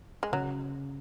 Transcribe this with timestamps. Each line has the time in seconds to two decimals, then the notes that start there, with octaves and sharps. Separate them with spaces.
0.23 G#3
0.32 C#3 F#3